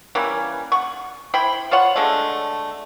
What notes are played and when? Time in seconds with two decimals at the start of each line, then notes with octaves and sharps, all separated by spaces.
0.15 E3 G3 A#3 C#4
0.72 F#5 C#6
1.34 E4 C5 G5 B5
1.71 F4 C5 C#5 F#5
1.96 D3 G#3 A3